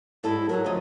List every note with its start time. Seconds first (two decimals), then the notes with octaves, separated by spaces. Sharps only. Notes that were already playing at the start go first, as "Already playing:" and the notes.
0.24 G#2 G3 E4 A4
0.49 F#3 G#4 A#4
0.66 D2 F3 D#5